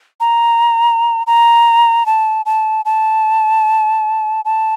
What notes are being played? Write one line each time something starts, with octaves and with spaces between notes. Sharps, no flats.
A#5
A#5
A5
A5
A5
A5